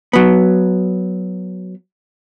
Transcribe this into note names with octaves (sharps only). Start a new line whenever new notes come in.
F#3 B3